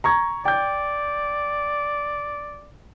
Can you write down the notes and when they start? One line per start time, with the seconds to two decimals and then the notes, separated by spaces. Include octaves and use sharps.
0.04 A#5 C#6 G#6
0.45 D5 G5 G6